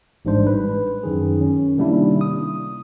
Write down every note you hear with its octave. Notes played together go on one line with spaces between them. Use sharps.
A1 G#2 G3 D4 C5
B4
F#2 D#3 G#4
C#4
C3 D#3 G3 A#3 D4 E4
D#6